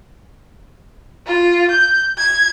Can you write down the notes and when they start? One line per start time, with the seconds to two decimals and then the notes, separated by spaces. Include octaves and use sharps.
1.26 F4
1.70 G6
2.18 G#6